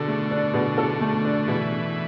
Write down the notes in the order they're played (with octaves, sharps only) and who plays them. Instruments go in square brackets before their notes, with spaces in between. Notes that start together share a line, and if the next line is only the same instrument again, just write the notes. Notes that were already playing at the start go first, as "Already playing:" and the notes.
Already playing: [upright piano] B2 A4 [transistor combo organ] D3
[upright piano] A3
D4
B2
A4
A3
D4
[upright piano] B2 [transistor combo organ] E3